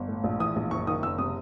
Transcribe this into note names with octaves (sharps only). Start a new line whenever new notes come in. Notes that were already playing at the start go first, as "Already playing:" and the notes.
Already playing: G1
A2
A#1
E3 D#6
A#1
F#1 C#6
D#3 D#6
F#1 E6
C3 D#6